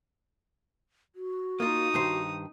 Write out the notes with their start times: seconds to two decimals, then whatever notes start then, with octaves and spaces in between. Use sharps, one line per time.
1.15 F#4
1.60 A#3 D#4 F4 A#4 D#6
1.94 G2 D#3 C5